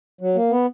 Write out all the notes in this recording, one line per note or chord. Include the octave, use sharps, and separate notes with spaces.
F#3
A#3
B3